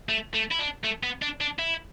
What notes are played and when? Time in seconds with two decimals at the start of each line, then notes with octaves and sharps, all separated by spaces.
0.09 A3
0.34 A3
0.51 E4
0.59 D4
0.84 A3
1.03 B3
1.22 D4
1.41 D4
1.59 E4